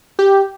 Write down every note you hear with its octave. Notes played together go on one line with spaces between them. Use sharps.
G4